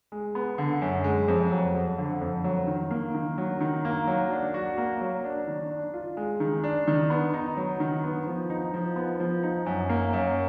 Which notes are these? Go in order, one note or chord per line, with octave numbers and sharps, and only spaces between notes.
G#3
B3
D3
F#2
G#3
F2
F#3
F2
D3
F2
F#3
D#3
A#3
D#3
F#3
D#3
A#3
F#3
D4
F#4
A#3
F#3
D4
D#3
D4
F4
G#3
D#3
D4
D#3
B3
D#4
F#3
D#3
B3
F3
D#4
F3
B3
F3
D#4
F#2
A#3
F#2